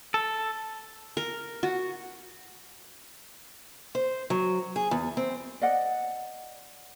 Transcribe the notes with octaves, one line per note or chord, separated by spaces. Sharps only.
A4
A#4
F#4
C5
F#3
G#4
E2
C4
D5 D#5 F#5